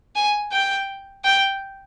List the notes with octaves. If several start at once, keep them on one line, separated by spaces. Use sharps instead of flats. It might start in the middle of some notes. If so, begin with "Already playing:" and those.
G#5
G5
G5